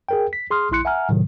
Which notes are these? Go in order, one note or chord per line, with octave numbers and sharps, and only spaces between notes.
G#4 A#4 G5
B6
G#4 C6 D#6 F6
A#1 E4 C6 F#6 C#7
E5 F#5 G#5 A#5 F6
A2 C3 D#3 F#3